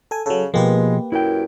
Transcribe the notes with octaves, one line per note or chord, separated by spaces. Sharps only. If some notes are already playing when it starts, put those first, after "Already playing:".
A4 G#5
C#3 F#3 A4
B2 F3 G#3 A#3 G4 B4
F#2 E4 G5